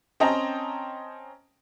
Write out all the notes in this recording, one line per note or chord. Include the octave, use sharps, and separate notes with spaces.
C4 C#4 D#5 G5 A5 A#5